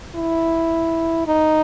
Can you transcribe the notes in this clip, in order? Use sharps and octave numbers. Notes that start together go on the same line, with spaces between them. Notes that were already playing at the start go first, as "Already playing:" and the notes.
E4
D#4